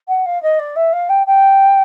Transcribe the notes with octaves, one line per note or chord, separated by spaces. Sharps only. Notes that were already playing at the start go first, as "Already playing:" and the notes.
F#5
F5
D#5
D5
E5
F5
G5
G5